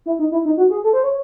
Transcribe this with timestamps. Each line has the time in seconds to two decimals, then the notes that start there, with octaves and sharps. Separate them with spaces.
0.06 E4
0.19 D#4
0.31 E4
0.45 D#4
0.57 F#4
0.70 G#4
0.84 A4
0.93 C5
1.03 C#5